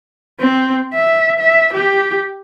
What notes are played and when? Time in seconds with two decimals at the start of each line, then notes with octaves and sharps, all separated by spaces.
0.40 C4
0.94 E5
1.39 E5
1.73 G4